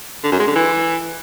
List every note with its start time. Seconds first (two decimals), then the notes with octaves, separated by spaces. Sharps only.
0.24 D3
0.32 F#2
0.40 G#3
0.48 D3
0.56 E3